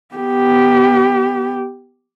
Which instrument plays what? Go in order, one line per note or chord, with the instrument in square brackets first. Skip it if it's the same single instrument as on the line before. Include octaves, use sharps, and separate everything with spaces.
[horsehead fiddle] B3 G4